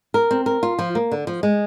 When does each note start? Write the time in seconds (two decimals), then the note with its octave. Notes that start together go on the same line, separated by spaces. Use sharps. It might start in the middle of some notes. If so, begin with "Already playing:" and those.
0.14 A#4
0.31 C4
0.46 A#4
0.63 F4
0.79 F3
0.95 A#3
1.12 D3
1.27 F3
1.43 G#3